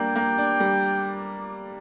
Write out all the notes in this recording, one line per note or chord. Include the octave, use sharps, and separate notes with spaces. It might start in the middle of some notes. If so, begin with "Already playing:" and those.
Already playing: G3 A#3 D4 G5
A#3
D4
G3